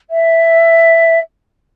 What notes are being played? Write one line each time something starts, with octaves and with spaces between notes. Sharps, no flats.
E5